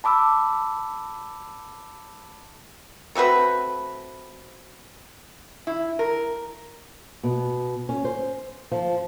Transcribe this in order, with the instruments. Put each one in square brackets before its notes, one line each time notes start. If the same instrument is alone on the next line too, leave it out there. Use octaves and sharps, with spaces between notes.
[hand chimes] A5 B5 D6 E6
[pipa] A3 C4 F#4 B4
[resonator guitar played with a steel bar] E4
A#4
[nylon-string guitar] B2
C#4
C5
F3